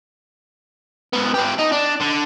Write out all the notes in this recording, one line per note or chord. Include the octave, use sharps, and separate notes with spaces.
G#2 B3
B3 G4
D#4
D4
D3